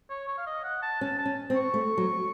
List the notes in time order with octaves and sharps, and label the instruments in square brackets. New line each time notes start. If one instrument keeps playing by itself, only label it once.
[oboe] C#5
C#5
F5
D#5
F#5
A5
[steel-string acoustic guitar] C#4 [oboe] A5
[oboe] A5
[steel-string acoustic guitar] C#4
C4
[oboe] C#6
[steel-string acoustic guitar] A3
F#3